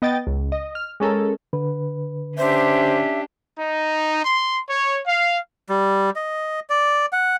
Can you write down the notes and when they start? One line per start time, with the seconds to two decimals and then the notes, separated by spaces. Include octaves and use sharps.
0.02 B3 D#5 G5 A6
0.27 C#2
0.52 D#5
0.75 F6
1.00 G#3 C#4 A4 A#4
1.53 D3 B4
2.38 C#4 D4 G4 C5 E5
3.59 D#4
4.24 C6
4.69 C#5
5.06 F5
5.69 G3
6.16 D#5
6.70 D5
7.13 F#5